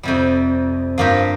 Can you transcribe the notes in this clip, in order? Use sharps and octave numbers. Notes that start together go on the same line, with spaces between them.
F2 C3 G3
G2 F3 A#3 G4